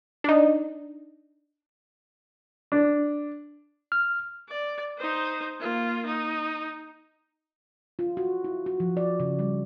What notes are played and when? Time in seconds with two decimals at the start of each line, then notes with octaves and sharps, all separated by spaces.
0.24 D4 D#4
2.72 D4
3.92 F6
4.49 D5
4.98 D#4 C5
5.60 A#3 F4
6.06 D#4
7.99 F4
8.17 F#4
8.44 E4
8.66 F#4
8.80 F3
8.97 D5
9.20 C#3
9.39 G3